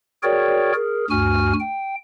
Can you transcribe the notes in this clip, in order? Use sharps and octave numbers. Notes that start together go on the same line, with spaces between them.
F#4 G#4 A#4 C#5 D5 G5
G#4 A#4
D2 G2 F#4 G#5 F6
G5